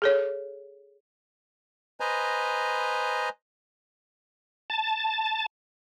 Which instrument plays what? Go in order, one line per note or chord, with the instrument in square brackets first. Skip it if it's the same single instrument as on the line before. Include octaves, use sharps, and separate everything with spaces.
[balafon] G#4 A4 C#5
[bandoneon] B4 C5 D#5 G#5 A#5
[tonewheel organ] A5